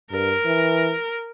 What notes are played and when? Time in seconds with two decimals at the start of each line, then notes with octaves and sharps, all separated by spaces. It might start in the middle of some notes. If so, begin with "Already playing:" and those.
0.11 G2 A#4
0.46 E3